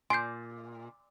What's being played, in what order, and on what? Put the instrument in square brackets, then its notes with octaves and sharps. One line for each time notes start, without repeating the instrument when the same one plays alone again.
[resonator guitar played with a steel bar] A#2 [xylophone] G#5 G6 [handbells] C6 C7